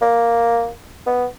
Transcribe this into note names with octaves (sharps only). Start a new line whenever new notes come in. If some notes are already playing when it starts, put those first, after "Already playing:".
A#3
B3